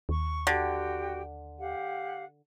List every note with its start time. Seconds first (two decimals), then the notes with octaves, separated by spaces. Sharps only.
0.09 D#2 C#6
0.47 D3 F#4 G4 G5
1.59 G4 F5 F#5